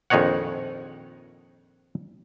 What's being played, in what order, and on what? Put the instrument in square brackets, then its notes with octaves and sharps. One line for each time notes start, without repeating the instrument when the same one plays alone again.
[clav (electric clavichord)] A#1 F2 D#3 D#4 C#5 F#5